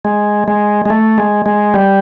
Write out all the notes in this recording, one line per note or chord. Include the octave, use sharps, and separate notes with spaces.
G#3
G#3
G#3
A3
G#3
G#3
G3